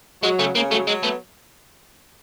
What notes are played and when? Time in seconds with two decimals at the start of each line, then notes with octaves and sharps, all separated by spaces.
0.23 F#3 G#3
0.39 C#3 A3
0.55 C#3 A#3
0.71 F#3 A3
0.87 F#3 G#3
1.03 A3 B3